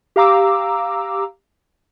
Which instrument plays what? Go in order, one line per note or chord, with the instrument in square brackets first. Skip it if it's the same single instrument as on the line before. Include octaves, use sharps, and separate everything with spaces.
[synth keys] G4 F5 A#5 D6 E6